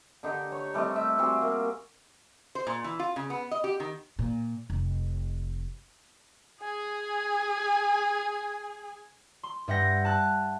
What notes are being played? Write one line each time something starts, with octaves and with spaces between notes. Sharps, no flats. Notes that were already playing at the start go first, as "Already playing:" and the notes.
D3 D#4 G4
C#5
G3 A3 C4 D#5
E5
G3 C4 F#4 G#4
A#3
C5
A#2
E3
F4
C#3
B3
D#5
G4
D#3
A#2
F1
G#4 G#5
C6
G2 E5 F#5 G6 A#6
A5 F#6